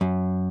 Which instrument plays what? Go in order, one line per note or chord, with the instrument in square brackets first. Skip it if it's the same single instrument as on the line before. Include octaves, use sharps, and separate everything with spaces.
[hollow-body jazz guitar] F#2